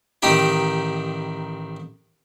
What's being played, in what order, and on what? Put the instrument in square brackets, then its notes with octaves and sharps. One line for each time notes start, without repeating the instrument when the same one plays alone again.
[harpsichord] A1 D#3 D#4 G4 G5